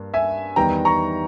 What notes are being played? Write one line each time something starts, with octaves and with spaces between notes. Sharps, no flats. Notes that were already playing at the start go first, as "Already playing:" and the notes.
Already playing: G2 A#3
E5 G#5
E2 D#3 G3 B3 G5 A#5
A#5 C#6